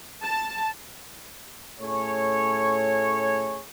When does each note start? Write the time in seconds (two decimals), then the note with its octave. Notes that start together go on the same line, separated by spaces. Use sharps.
0.22 A5
1.80 A2 A3 C#4 G#4 A4 C#5